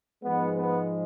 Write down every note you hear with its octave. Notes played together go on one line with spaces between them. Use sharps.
G#2 F3 G#3 B3
B3